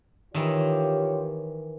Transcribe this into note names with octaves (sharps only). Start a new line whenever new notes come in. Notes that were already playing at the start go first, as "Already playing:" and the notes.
D#3 E3 F4 G4 C#5